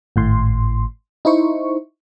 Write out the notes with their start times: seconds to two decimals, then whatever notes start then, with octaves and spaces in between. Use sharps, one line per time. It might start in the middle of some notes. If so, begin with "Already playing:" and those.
0.16 G#1 A2 C6
1.25 D#4 E4 C5 C#6